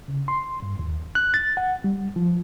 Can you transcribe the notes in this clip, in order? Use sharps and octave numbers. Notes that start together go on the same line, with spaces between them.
C#3
C6
G2
D#2
F#6
A6
F#5
G3
F3